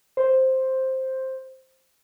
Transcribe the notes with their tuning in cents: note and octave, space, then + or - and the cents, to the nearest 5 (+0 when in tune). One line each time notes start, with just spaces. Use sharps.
C5 +5